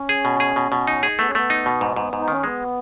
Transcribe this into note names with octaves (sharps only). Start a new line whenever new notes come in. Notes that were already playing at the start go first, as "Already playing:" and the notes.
Already playing: C#4
G#4
B2
G#4
B2
B2
D#4
G#4
A3 B3
C#4
A3 B3
D#4
B2
G#2
G#2
G#2
D#4
D#3 C#4
G#3 B3